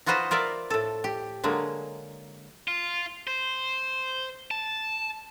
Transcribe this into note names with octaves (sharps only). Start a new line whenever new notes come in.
D#4 F4 F#4 B4 C5 D#5
F4 A#4 D5 E5
A2 A4
G4
D3 F#3 G#3 A#3
F4
C5
A5